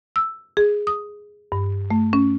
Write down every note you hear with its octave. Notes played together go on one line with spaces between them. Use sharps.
E6
G#4
D#6
G2
A3
C#4